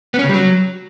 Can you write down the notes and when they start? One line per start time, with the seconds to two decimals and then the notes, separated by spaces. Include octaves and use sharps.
0.14 B3
0.19 C#4
0.24 C#3
0.29 G3
0.34 F#3